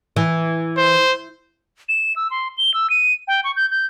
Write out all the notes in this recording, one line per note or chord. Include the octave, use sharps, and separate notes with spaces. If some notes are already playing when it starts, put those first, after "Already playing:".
E3
C5
E7
E6
C6
G7
E6
D#7
G5
C#6
G6
G6